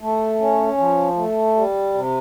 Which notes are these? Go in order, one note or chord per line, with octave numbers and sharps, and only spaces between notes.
A3
C#4
F3
A3
G3
C3